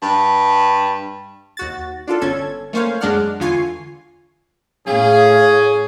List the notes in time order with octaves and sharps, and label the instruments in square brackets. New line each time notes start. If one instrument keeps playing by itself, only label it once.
[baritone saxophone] G2
[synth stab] D#2 F#4 A6
D4 F4 A4
G1 C#4 A4 G#6
A3 A#3 C#4 C5 C#5 F5
F#2 G#3 D4 D5 F#5 F6
E2 D3 F4 G#5 C#6 C7
[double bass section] A2 [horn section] C#4 G#4 [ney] F5